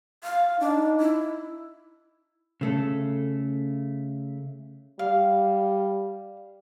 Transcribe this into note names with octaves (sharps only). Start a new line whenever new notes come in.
F5
D4 D#4
E4
C#3 A3 A4
G3 F5